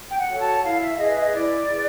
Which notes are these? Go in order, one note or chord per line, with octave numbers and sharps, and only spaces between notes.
G5
F#5
F#4 A4 C#5
A5
E4 F5
E5
G#4 B4 D#5
E5
D#5
D#5
E4 D5
G#4 B4